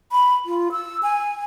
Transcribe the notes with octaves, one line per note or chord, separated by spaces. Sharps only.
B5
F4
E6
G#5